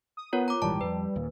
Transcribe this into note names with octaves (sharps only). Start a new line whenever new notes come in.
D#6
B3 F4 A#4 C#5
A#5 D6
A#1 G#2 E3 G3 A5
F2 B4
D#1 D#2 A#2